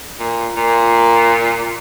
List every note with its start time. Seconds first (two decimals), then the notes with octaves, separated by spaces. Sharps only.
0.20 A#2
0.56 A#2